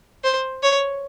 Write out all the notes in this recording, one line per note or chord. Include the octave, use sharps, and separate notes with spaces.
C5
C#5